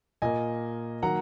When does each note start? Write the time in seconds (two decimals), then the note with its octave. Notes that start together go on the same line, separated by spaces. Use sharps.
0.22 A#2 A#3 D#5 G#5
1.02 D#3 F#3 A#3 F#5 A#5